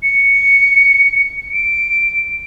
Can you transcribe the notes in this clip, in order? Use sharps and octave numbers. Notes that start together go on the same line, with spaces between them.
C#7
D7